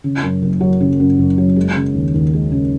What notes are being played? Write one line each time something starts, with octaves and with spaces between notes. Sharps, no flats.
C#3
F#2
F#1
F#3
C#3
F#2
F#1
F#3
G#3
C#3
D#2
D#2
G#3
C#3